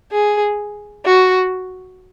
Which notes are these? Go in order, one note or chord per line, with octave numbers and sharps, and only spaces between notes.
G#4
F#4